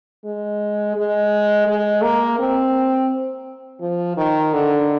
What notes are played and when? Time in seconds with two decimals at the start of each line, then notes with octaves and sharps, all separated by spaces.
0.25 G#3
0.96 G#3
1.67 G#3
2.02 A#3
2.39 C4
3.81 F3
4.17 D#3
4.53 D3